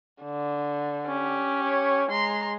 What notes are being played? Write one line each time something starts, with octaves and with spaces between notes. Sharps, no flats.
D3
C#4 G4
C#5
G#3 A#5 C6